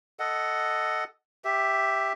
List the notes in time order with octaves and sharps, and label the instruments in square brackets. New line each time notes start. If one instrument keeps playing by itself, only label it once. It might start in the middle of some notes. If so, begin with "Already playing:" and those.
[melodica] A4 D#5 F#5
G4 E5